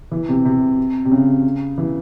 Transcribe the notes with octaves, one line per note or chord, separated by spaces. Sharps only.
E3
C3
C3
C3
C#3
E3